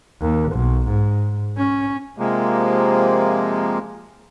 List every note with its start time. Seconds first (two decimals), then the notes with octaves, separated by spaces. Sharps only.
0.21 D#2
0.53 B1
0.89 G#2
1.58 C#4
2.18 C3 F3 G#3 A#3